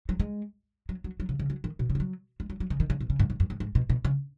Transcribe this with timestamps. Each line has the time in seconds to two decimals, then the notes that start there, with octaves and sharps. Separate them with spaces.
0.09 F#3
0.20 G#3
0.89 F#3
1.04 F#3
1.20 F#3
1.29 C#3
1.39 C#3
1.50 F#3
1.64 D#3
1.79 B2
1.90 C#3
1.95 G#3
2.00 F#3
2.40 G#3
2.50 F#3
2.60 F#3
2.70 C#3
2.80 D#3
2.90 C#3
3.00 B2
3.10 C#3
3.19 G#2
3.30 G#2
3.40 F#2
3.50 G#2
3.60 G#2
3.75 B2
3.90 B2
4.05 C#3